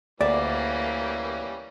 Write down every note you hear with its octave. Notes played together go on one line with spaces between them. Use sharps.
D2 E3 G3 A#3 C#4 D5 E5